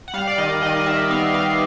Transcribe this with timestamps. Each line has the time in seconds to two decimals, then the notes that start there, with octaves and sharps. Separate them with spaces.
0.08 F#5
0.14 G3 F5
0.27 D5
0.38 D#3 D#5
0.62 D#3 D#5
0.77 D#5
0.86 D#3 E5
1.10 B3 F5
1.34 G3 F5